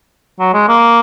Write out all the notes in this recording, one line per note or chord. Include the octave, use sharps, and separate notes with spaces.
F#3
G#3
A#3